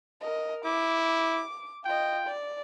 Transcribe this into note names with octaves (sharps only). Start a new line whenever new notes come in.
A#4 D#5
E4 D6
F4 D#5 G5
D5